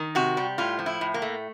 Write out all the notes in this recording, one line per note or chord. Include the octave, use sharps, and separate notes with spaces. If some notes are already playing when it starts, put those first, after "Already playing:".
Already playing: D#3
C3 F#4
G3
A2 F4
F3
E4
A2
A#3
A3